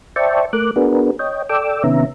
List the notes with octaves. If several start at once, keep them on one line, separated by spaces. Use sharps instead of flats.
C5 D5 E5 G5 A5 C#6
A3 A#4 D6 F#6
B3 D4 F#4 G#4 A#4 B4
C#5 D#5 G5
A4 D5 G5 D6 E6
C3 D#3 B3 C#4 E5 A#5